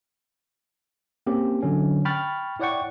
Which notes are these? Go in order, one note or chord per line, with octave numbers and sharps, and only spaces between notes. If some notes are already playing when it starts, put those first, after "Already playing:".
A#3 C4 C#4 G4
D3 F#3 C#4
G5 B5 C#6 F6 A6
E4 C#5 D5 F#5 G5 C#6